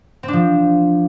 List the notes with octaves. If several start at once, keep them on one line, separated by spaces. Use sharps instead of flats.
C4
D4
F3